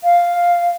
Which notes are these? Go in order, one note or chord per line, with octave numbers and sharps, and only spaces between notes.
F5